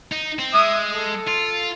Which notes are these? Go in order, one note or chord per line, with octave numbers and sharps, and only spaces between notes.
D#4
C4
G#3 E5 D#6
A4
F4